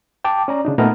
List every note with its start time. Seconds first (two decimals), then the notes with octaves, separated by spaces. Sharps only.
0.24 G5 A5 D6
0.48 C#4 D5 A#5
0.65 C#3 D4 D#4
0.78 A#2 A3 B3 D#4 A#5 F6